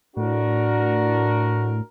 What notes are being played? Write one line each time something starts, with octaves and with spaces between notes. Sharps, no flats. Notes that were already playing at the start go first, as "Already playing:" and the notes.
A2 D4 F#4 A#4